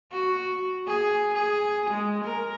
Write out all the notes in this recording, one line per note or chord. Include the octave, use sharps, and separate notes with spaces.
F#4
G#4
G#4
G#3
A#4